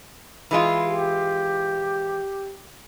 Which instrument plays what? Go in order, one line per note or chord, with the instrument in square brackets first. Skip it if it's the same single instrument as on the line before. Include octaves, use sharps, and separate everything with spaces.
[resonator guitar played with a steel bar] E3 G#3 F4
[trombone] G4